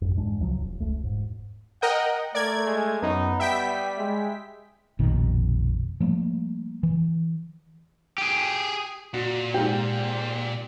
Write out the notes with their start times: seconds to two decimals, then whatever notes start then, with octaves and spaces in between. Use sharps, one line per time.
0.01 A1 F#2
0.16 E2 G#2 G#3 D4
0.40 C#2 C3 F3 F#3
0.61 E1
0.80 E1 C#2 A3
1.03 E1 G#2
1.82 A#4 D#5 F#5 G5
2.35 A3 A#4 D5 G#6
2.66 G#3
3.02 F#2 B3 D#4
3.40 G3 E5 G5 B6
3.98 G#3
4.99 F1 A#1 B2 D#3
6.00 F3 G3 A3 A#3
6.83 E3
8.18 G4 G#4
9.14 A#2 F#4
9.54 G#2 G4